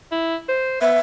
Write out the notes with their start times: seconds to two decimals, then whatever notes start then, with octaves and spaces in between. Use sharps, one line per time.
0.12 E4
0.49 C5
0.81 B3 E5